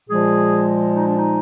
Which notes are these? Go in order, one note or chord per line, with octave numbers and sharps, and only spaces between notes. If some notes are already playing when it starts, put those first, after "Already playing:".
A#2 F3 G#3 G#4
D#4
D4
D#4